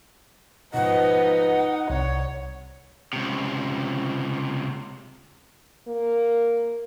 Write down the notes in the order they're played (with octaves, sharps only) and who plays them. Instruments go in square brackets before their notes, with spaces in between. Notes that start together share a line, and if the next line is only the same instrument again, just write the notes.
[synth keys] G#2 B2 [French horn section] F3 B4 D#5 [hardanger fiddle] D#4 [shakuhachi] F#5
[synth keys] C2 C3 D5 [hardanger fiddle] C#5
[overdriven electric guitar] C#2 C3
[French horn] A#3